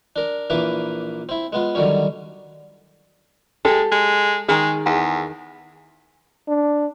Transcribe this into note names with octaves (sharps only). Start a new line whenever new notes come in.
D4 A#4
A#1 E3 A#3 B4 D6
C4 E4
G#3 B3 F4
D3 D#3 F#3 G3 C#4
G#3 G4 A4
G#3
D#3 G#3 G#4
E2
D4